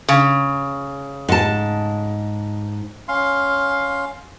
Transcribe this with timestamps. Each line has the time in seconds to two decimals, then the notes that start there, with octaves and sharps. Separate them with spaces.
0.09 C#3
1.29 G#2 A5
3.08 C#4 F5 C6